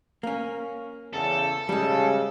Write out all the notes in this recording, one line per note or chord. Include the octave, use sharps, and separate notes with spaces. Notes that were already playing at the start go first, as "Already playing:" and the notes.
A#3 C#4
E2 C#3 A4
G#2 C#3 G3 G#3